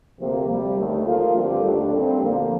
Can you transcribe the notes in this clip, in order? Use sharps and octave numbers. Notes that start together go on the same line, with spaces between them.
D2 C3 F3 A#3
D2 C3 G3
D#2 D3 A3
F3 A#3 F4
G2 D3 G3 C4 G4
D#2 D3 A3 D4
A#2 G3 C4
D2 D3 F3 A#3